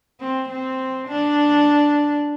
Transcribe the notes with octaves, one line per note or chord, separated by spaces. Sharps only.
C4
C4
D4